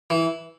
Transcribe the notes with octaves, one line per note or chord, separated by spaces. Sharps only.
E3